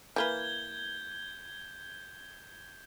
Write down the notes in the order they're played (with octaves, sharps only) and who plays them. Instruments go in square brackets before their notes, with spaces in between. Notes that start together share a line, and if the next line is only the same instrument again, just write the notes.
[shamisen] E3 A#3 B4 [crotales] G6 G#6 G7